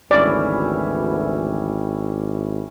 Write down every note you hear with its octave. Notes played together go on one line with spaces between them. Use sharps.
G#1 D2 E3 G3 C#4 E4 D5